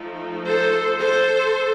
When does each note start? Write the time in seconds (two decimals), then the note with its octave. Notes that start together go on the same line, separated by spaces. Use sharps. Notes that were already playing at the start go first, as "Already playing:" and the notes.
Already playing: F3 A3 D#4
0.48 A4 C5
1.01 A4 C5